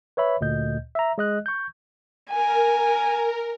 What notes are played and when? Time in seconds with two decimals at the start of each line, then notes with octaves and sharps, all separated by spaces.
0.17 B4 C#5 E5 B5
0.41 D2 A#2 D#5 G6
0.95 E5 A#5
1.18 G#3 D#5 F#6
1.46 C#6 G6
2.31 A#4 G#5